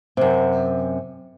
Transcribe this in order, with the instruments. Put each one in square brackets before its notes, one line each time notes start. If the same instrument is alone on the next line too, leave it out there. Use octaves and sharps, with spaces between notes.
[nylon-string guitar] F#2 C3